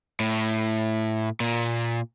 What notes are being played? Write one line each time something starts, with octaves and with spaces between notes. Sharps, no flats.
A2
A#2